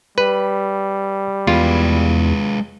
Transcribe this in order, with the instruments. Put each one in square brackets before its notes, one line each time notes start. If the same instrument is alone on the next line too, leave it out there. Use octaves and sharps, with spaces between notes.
[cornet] G3 [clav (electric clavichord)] B4
[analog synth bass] E2 [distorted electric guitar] G#3 B4 [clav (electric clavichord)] F4